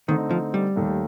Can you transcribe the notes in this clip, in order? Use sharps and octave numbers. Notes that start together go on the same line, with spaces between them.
D3 D#3 A3 C4 D#4
F3
G3
D#2 D#3 A3